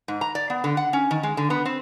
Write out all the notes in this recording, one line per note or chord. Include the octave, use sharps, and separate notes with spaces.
G#2
A#5
D5
B3
D3
F#5
C#4
D#3
G#3
D3
B3
C4